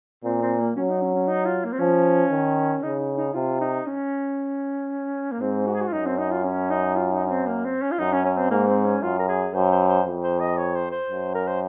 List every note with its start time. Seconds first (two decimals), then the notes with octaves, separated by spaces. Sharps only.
0.24 A#2 C4
0.42 C4
0.59 A#3
0.76 F#3 C#4
0.89 D#4
1.02 C#4
1.15 C#4
1.28 D#4
1.45 F4
1.65 A#3
1.72 C4
1.79 F3 C#4
2.31 D#3
2.83 C#3 D#4
3.00 D#4
3.17 D#4
3.34 C3 F4
3.60 D#4
3.86 C#4
5.32 A#3
5.40 G#2 C4
5.66 F#4
5.74 G#4
5.81 F#4
5.88 F4
5.92 F#2 D#4
6.06 C4
6.18 D#4
6.31 F4
6.44 C#4
6.70 D#4
6.96 F4
7.13 D#4
7.26 C#4
7.31 C4
7.47 A#3
7.65 C4
7.82 C#4
7.91 F4
7.99 F#2 D#4
8.12 C#4
8.25 C#4
8.38 C4
8.51 G#2 A#3
8.68 C4
8.85 C#4
9.02 F#2 F4
9.19 A#4
9.28 G#4
9.54 F#2 C5
9.71 C5
9.89 C5
10.06 F2
10.23 C5
10.40 D#5
10.57 C#5
10.75 C5
10.91 C5
11.10 F#2
11.35 A#4
11.47 C5